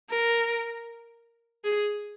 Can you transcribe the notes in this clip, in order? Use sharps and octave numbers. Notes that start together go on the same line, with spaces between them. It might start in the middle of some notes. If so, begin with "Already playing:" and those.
A#4
G#4